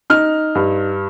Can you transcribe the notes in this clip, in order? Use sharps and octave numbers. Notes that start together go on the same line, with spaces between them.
D#4 F6
G2